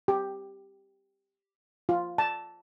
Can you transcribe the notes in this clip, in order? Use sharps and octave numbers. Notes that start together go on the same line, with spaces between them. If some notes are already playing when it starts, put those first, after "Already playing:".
G4
F4
A5